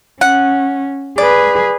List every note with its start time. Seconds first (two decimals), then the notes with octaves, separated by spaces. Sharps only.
0.21 C#4 F#5
1.18 G#4 B4 D5